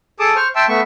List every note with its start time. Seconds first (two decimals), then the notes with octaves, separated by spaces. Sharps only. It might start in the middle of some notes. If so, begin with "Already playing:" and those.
0.19 G#4 A4 A5 D6 D#6
0.36 C5 C#6 F6
0.55 E5 G5 A5 C6 E6
0.68 A3 B3 E5 C#6